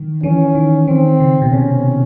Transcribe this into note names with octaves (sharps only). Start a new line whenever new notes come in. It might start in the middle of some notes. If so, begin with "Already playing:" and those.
Already playing: D#3
E3 C#4
D#3
D#3 C4
C#3
B2
C3 C#4